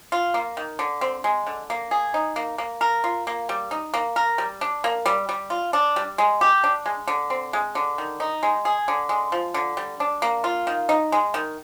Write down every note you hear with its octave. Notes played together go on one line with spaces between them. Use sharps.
F4
A#3
D#3
D3
C4
G#3
D3
A#3
G#4
D#4
A#3
A#3
A#4
F4
A#3
G3
D#4
A#3
A#4
G3
D4
A#3
G3
G3
F4
D4
G3
G#3
G4
D4
G#3
D3
C4
G#3
D3
D#3
D#4
G#3
G#4
D3
G#3
F3
D3
G3
D4
A#3
F4
D#3
D#4
G#3
D#3